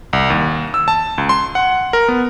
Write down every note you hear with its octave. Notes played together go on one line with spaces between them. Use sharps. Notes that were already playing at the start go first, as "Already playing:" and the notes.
C2
D#2
E6
A5
C#2
C6
F#5
A#4
B3